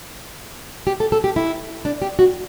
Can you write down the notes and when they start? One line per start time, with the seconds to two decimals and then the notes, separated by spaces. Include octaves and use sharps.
0.87 G4
1.00 A4
1.12 A4
1.24 G4
1.36 E4
1.85 D4
2.02 G4
2.19 F#4